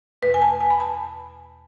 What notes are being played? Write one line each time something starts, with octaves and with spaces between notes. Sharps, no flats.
E2 B2 A3 B4
G#5
A5
G#5
B5
A5